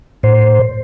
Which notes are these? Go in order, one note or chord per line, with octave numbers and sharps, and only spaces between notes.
A2 C5